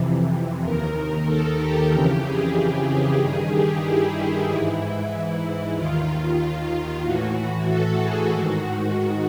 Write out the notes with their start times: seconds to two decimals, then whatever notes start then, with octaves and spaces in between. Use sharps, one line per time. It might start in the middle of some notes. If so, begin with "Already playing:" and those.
Already playing: F2 C3 E3
0.63 D#2 D#3 A#4
1.27 A4
1.59 G4
1.90 F2 C#3 E3 G4
2.23 G#4
2.55 G#4
3.19 G2 D#3 G#4
3.50 G4
3.83 E4
4.47 G#2 E3 E4
5.11 E4
5.76 D#2 D#3 F4
7.03 A2 E3 F#4
7.67 A4
8.00 G#4
8.31 G#2 D#3 F#4